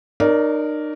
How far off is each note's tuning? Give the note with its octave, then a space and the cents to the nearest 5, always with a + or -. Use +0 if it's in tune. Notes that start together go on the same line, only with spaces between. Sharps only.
D#4 -40 A#4 +0 D5 -35